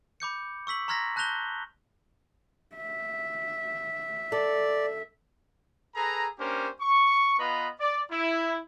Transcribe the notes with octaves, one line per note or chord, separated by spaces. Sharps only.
B5 D6 G6 C#7
C#6 E6 B6 F#7
A#5 C6 F6 G#6 A#6 B6
A5 F#6 G6 A#6 F7 G7
E5
A4 D5
G#4 A4 B4 A#5
A#3 C#4 D4 G4 A#4 C5
C#6
B3 F4 B4 D#5 A#5 B5
D5
E4